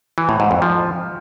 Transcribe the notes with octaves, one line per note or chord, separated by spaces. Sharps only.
E3
A2
G#2
F2
F3